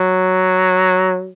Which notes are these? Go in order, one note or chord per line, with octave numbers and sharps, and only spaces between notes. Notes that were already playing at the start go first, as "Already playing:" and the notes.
Already playing: F#3